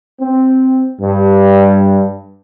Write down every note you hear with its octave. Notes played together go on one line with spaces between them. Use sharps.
C4
G2